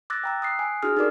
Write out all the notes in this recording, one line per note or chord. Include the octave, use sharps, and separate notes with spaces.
D6 E6 F#6 A6 A#6
G5 A#5 E6
D#6 F#6 C7
G#5
D4 E4 F#4 G#4 D#6 F6
D#4 G4 A4 A#4 D5 D6